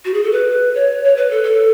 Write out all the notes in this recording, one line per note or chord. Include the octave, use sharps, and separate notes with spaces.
F#4
G#4
A4
B4
C#5
C#5
B4
A4
A4